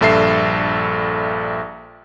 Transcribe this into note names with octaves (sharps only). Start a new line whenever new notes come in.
A#1 G2 A4 E5 C7